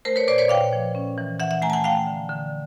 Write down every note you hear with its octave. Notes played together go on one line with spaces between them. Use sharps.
A3 A#4 C5
B4 C#5
A#2 C5 D5
B4 C#5
A#2 F5 G5
F3
C#4
E3
E3 E5 F#5
E5 F#5
A3 G#5 A#5
A5
F#5 G#5
A3 F5 G5
D3
D3